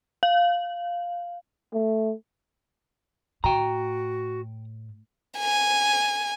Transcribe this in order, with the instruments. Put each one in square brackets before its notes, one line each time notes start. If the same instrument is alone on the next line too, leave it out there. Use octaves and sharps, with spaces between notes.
[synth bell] F5
[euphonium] A3
[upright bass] A2 [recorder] F#4 [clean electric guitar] G5 A#5
[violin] G#5